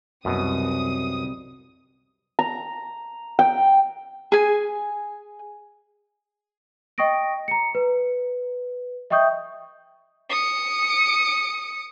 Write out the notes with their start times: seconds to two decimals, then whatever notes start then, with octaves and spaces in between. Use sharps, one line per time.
0.25 C2 F#2 B2 D#6
2.39 A#5
3.39 G5
4.32 G#4 G#5
6.98 D#5 G5 C#6 D#6 A#6 D7
7.48 A#5 C#7
7.75 B4
9.10 D#5 E5 G5 C#6 D#6 G6
10.30 D#6 C#7